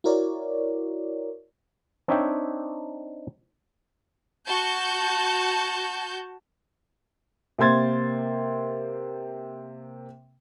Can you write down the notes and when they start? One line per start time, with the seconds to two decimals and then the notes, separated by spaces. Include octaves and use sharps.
0.04 E4 F#4 A#4 C#5 D5
2.08 C4 D4 D#4 C#5 E5 G5
4.47 F#4 A5 G6
7.58 C3 A#3 C5 C6 G#6 A6